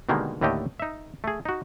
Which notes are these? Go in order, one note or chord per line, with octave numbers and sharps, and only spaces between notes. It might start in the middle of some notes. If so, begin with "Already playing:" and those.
B2 D3 D#3 G3 G#3 A#3
D#2 A2 D3 A3 G4 D#5
D#4 E5
A3 G#4
D#4 F#4